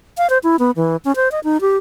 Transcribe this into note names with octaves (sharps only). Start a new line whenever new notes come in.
F5
C5
E4
B3
E3
C#4
C5
D#5
D#4
G4